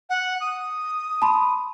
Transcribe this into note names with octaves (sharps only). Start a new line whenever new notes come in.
F#5
D#6
A5 B5 C6